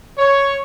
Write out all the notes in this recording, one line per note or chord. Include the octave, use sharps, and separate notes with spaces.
C#5